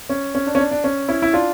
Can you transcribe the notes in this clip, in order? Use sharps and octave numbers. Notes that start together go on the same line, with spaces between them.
C#4
C#4
D4
C#4
D4
D4
C#4
C#4 E4
E4
D4 F4